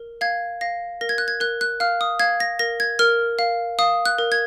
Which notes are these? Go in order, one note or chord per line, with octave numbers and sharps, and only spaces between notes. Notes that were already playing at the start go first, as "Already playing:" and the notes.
Already playing: A#4
F5 G#6
F5 A#6
A#4 A#6
G#6
F#6
G#6
A#4 F#6
F#6
F5 F6
D#6
F5 G#6
A#6
A#4 A#6
G#6
A#4 F6
F5
F5 D#6
F#6
A#4
G#6